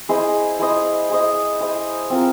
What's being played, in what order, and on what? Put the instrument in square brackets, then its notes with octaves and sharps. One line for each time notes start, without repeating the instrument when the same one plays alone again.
[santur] E4 G#4 C5 D#5
E4 G#4 C5 D#5
E4 G#4 C5 D#5
E4 G#4 C5 D#5
C4 F4 A#4